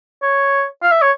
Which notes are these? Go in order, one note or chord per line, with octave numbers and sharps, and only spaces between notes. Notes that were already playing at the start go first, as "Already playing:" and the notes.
C#5
F5
E5
C#5